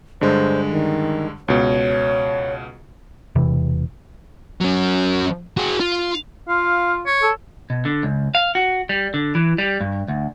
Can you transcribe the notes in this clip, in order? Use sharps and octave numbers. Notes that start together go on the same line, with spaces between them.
G2 D3 G#3 C5
D#3
C#2 B2 C#5
E1 C3 E3
F#3 C#4
F#4 G#4
F4
F4 F5
C#5
A4
B2
D3
C#2
F5
F#4
G3
D3
E3
G3
G2
D2